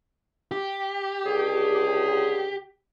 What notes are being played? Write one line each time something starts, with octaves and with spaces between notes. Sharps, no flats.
G4
C#2 D3 G#4